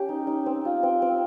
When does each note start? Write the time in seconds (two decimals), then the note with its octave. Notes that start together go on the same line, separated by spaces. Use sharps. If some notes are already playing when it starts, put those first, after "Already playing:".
Already playing: C#4 G4
0.09 D#4
0.27 D#4
0.46 C4
0.65 F4
0.83 C4
1.02 C4